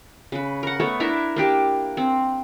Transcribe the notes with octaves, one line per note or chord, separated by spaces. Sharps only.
C#3 B4
A#4 F#5
A3 B3 A4 C#5
D4 E4 A#4 E5
A#3 D4 G4
C4